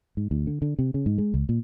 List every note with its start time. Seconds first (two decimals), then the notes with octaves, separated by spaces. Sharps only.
0.17 G#2
0.31 D2
0.47 D3
0.62 D3
0.79 C3
0.94 C#3
1.06 G#2
1.18 G#3
1.34 C#2
1.49 A#2